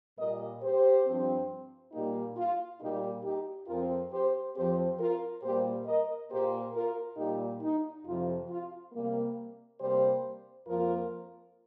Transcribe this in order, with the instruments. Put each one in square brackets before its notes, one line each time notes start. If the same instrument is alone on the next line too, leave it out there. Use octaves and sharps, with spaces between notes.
[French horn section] A#2 G3 A#3 A#4 D#5
G4 C5
G2 F3 C4
A#2 G3 A#3 D#4 G4
F4
A#2 G3 A#3 D#4 G4
D#4 G4
F2 F3 C4 F4 A#4
G4 C5
F2 F3 C4 G4 C5
F4 A#4
A#2 G3 A#3 G4 C5
A#4 D#5
A#2 A#3 G4 C5
F4 A#4
A#2 G3 A#3 D#4 G4
D#4
F2 C3 F3 F4
F4
C3 G3 A#3
C3 G3 A#3 G4 C5
F2 F3 A#3 F4 A#4